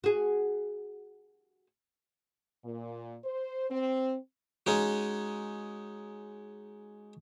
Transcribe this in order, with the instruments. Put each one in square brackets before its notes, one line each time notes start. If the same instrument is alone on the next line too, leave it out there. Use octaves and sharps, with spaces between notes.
[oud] F#4 G#4
[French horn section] A#2
C5
C4
[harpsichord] G#3 C#4 D#4 F#4